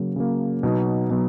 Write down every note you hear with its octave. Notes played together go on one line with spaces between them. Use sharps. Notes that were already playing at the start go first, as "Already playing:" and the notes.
Already playing: C#3 F#3 A#3
C#3 F#3 A#3
B2 F#3 B3 D#4
B2 F#3 B3